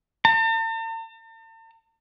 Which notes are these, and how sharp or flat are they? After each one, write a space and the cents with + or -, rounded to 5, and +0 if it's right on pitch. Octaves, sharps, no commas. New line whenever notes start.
A5 +45